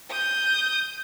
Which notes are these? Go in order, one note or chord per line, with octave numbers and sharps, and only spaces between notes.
D#6 G6